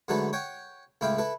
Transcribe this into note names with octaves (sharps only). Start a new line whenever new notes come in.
G#2 D3 F#3 A3 A4 B4
C#5 F#5 G5
C#2 A2 E4 E5 F5 G5
E4 A4 B4